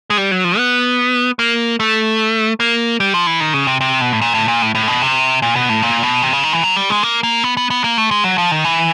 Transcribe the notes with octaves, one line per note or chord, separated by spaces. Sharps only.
G#3
G3
F#3
F3
B3
A#3
A3
A#3
G3
F3
E3
D#3
C#3
C3
C3
B2
A2
A#2
A2
A#2
A2
A2
B2
C3
A#2
B2
A2
A#2
B2
C3
C#3
D#3
E3
F#3
G3
G#3
A#3
A#3
B3
B3
B3
A#3
A3
G#3
F#3
F3
D#3
E3